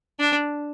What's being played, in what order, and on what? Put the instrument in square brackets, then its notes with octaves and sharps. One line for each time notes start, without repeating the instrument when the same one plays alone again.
[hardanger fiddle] D4